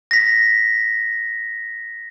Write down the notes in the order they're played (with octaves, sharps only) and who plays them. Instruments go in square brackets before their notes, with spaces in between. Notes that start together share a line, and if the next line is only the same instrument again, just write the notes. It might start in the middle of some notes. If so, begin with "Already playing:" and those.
[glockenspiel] A#6 B6